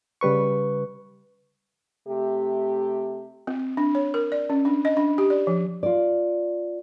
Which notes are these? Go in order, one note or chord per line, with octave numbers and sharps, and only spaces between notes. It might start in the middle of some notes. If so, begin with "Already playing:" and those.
C#3 G3 B4 C#6
C3 A3 G4
C4
D4
C#5
A#4
D5
C#4
D4
D#5
D4
G4
D5
F3
F4 D5